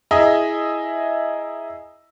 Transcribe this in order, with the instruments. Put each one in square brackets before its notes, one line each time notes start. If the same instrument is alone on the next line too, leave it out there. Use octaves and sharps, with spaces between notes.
[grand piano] E4 G#4 D#5 E5 A#5